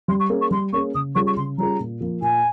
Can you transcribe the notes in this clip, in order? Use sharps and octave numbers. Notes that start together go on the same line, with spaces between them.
G3 C6
C#6
A#3 C#4 G#4
C#6
G3 C6
A#3 C#4 G#4 C#6
C#3 D#6
G3 C#4 F4 G#4 C#6
C#6
C#3 C6
G3 C#4 F4 G#4 A#5
A#2
F3 A#3
A#2 G#5